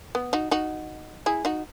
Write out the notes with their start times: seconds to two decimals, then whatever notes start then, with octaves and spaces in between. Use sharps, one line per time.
0.15 B3
0.33 D#4 F#4
0.51 D#4 F#4
1.26 E4 G#4
1.45 D#4 F#4